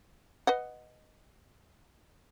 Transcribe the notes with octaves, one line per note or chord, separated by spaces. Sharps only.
B4 D#5 F#5